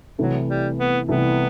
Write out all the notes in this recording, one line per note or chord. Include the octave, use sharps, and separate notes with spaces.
C2 C3 E3 F#3 A3
G3
B3
C2 C3 E3 A3 B3